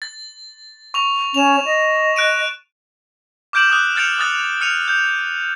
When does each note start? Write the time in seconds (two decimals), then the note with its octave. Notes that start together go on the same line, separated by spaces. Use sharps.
0.02 A6
0.94 C#6 F7
1.34 C#4 E7 F7
1.65 D#5
2.16 F#6 D7 D#7
3.53 D6 F6 G6 D7 E7 F#7
3.70 D6 D#6 F#6
3.96 F6 G6 A6 C#7 D7 F7
4.18 D#6 F#6 A6
4.61 F6 C#7 D#7 F7
4.88 G6